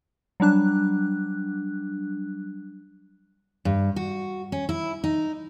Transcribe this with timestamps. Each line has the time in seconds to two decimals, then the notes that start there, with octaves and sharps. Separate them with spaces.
0.40 F#3 G3 D4 F#6
3.65 G2
3.96 F#4
4.52 C#4
4.69 E4
5.04 D#4